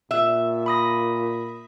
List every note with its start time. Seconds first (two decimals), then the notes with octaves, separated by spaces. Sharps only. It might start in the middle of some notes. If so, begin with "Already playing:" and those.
0.11 A#2 E5
0.66 B5 D#6 A#6